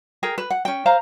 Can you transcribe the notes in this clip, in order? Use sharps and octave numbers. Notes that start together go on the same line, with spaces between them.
G#4 A#4 G5
B4
F#5
C#4 G5
C5 F5 A#5